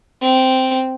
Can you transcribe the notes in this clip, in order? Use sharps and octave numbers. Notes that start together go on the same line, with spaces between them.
C4